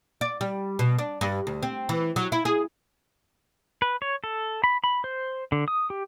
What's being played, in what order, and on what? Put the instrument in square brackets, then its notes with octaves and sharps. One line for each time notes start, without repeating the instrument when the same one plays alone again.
[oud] D5
G3
B2
D4
G2
D2
C4
E3
F#3
E4
G#4
[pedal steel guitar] B4
C#5
A4
B5
B5
C5
D3
D#6
G4